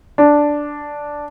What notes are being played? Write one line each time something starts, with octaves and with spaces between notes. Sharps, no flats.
D4